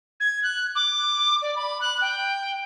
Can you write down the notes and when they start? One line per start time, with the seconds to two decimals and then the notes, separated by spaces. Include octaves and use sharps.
0.20 G#6
0.43 F#6
0.75 D6
1.42 D5
1.56 B5
1.81 F#6
2.01 G5